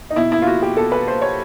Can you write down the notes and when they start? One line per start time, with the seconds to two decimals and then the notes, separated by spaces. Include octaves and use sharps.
0.10 D#4
0.16 B2 E4
0.32 E4
0.42 F4
0.47 F#4
0.62 G4
0.77 B2 A4
0.92 B4
1.08 C5
1.22 C#5